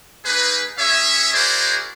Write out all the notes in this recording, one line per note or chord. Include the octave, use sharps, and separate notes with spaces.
A#3 D#4 G#4 B4
C#4 G#4 C#5 E5
E4 F#4 G#4 A#4 C5 D5